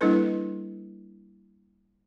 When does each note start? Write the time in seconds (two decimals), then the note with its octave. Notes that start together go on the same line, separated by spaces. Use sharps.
0.01 G3 A#3 D4 E4 A4 B4